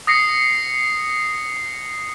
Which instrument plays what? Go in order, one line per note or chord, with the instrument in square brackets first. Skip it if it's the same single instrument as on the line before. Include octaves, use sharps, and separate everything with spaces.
[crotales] D#6 A#6 C7 C#7